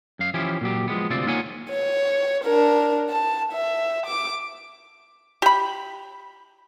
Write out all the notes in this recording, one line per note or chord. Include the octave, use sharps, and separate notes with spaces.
F#2 F5
E3 F3 C#4 E4 G4
A#2 F#3 G4
F3 G#3 B3
D2 C3 C4 F4 D5
A#3 D#4 F4 C#5 F#5 G#5
C#5
D4 A#4
A5
E5
D6
G4 B5